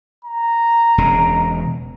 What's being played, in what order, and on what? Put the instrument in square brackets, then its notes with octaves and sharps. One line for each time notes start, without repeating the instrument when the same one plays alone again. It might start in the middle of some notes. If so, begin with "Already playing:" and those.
[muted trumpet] A#5
[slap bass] E1 C#3